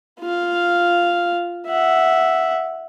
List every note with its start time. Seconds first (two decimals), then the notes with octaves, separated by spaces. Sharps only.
0.20 F4 F5
1.66 E5 F#5